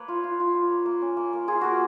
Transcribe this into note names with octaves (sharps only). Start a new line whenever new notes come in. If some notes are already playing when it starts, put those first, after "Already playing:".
Already playing: A#3 B4 C#5
F4
F4
F4
F4
A#3
A#3
C#4
A#3
A#3
F4 G#4
A#3 F#4